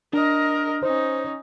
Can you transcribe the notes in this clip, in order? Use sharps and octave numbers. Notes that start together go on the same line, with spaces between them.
D4 A#4 D#5
C#4 D#4 C5